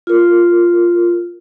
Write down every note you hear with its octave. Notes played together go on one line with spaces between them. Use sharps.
F4 A#4